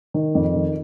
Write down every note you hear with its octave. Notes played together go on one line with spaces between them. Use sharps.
D#3
F2
D#3